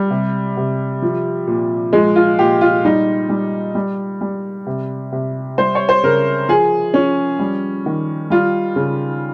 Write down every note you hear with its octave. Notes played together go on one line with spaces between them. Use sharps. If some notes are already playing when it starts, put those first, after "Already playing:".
Already playing: G3
C3
C3
F3
A#2
F3 G#3
F4
A#2 G4
F4
G3 D#4
G3
G3
G3
C3
C3
G3 C5
C#5
C5
C#3 A#4
F3 G#4
F3 C#4
G3
D#3
G3 F4
C#3